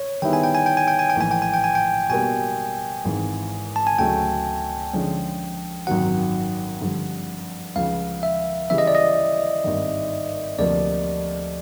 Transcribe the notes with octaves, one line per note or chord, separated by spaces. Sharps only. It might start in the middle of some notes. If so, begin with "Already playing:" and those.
Already playing: C#5
D#3 G3 B3 E4 G#4 G5
G#5
G5
G#5
G5
G#5
G5
G#5
G5
A#1 A2 E3 G#5
G5
G#5
G5
G#5
G5
B2 G3 A#3 G#5
G#1 G#2 E3
A5
G#5
D2 C#3 F#3 A3 G5
D3 F3 G#3 C#4
G#1 F#2 D#3 F#3 F#5
G2 D3 F3
C#2 C#3 F3 F5
E5
C#3 E3 G3 E5
D#5
D5
D#5
G#1 G2 D#3
D2 C3 F3 A#3 D5